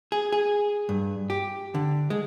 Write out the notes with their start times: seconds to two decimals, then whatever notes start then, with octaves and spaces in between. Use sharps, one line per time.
0.12 G#4
0.32 G#4
0.89 G2
1.30 G4
1.75 D3
2.10 G#3